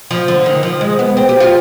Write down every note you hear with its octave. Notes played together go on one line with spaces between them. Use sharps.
F3
D3
D#3
F3
G#3
B3
C4
G4
F4